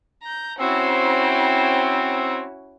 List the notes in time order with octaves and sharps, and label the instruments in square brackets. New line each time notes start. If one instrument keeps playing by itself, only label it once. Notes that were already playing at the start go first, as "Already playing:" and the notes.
[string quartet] A#5 G6
[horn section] C4 [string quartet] C#4 E4 F#4